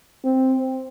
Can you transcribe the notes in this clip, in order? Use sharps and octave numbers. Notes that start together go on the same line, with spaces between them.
C4